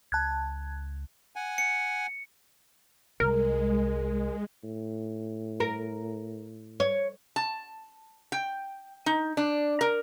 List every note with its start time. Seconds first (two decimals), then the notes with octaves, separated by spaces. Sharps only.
0.12 C#2 A5 F#6 G#6
1.36 F#5 G#5
1.58 C#7
3.20 C2 G#3 A#4
4.64 A2
5.60 A#4
6.80 C#5
7.36 A5
8.32 G5
9.06 D#4
9.37 D4
9.81 A#4